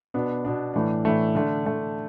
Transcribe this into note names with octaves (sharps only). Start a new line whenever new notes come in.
B2 B3 D4
B2 B3 D4
A2 E3 A3 D4
A2 E3 A3 D4
D3 A3 D4
D3 A3 D4